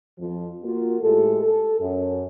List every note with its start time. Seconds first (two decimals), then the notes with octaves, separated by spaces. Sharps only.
0.19 F2 F3
0.63 A#3 F4 F#4
1.02 A2 G#3 G4 A4
1.43 A4
1.80 F#2